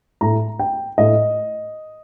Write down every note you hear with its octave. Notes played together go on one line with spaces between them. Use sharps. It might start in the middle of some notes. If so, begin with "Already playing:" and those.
A2 A#5
G5
A2 D#5